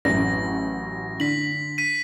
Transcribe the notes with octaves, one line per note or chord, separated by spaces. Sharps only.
A1 F#2 A#6
D3 B6 F#7
B6 D#7